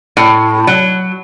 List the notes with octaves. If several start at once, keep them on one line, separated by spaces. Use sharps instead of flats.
A2
F#3